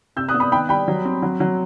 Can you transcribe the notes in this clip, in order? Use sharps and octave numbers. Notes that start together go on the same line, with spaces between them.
C3 E6 G6
D#6 F#6
B3
B5 D#6
D#3 G5 B5
G3 G5 B5
F#3
C4
F#3
F#3